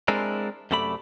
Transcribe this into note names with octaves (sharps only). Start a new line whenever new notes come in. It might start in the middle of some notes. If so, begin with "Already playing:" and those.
G#3 C4 D4 E4 A#4
F#2 C3 A3 D5 B5